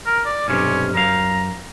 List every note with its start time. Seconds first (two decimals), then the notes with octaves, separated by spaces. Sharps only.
0.06 A#4
0.26 D5
0.48 B1 G2 C3 C#4
0.94 F#2 F5 A#5